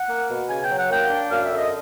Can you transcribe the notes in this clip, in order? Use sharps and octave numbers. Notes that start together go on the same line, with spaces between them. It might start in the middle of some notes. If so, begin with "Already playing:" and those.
Already playing: F#5
A#3
B2
C#3 G#5
G5
F#3
F#5
A#3 G5
D4
F#2 F5
E5
D3
D#5